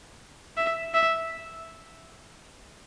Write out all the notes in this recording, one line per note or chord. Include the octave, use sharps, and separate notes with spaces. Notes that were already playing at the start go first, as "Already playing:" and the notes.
E5
E5